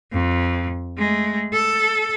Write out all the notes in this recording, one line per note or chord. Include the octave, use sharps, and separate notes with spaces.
F2
G#3 A3
A4